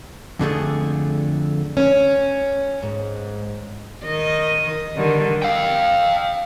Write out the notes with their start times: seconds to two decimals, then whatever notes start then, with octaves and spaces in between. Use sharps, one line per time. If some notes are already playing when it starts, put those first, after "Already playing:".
0.39 F2 D3 A3 G#4
1.77 C#4
2.83 G#2
4.04 D#3 D#5
4.96 D3 D#3 G3
5.42 F5 G5